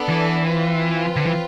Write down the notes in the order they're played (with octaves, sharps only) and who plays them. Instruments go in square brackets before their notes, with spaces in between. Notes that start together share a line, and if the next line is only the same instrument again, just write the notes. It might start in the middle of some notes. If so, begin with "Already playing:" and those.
Already playing: [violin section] B3 D4 A4 D5
[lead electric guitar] E3
[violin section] C4 F4 B4
[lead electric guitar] D3
E3